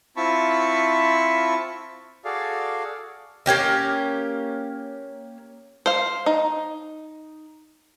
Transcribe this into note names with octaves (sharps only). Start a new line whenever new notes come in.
C4 E4 F4 A5 B5 C#6
F#4 G#4 A4 D5 F5
A#3 C#4 G4 A#4
C5 F5
D#4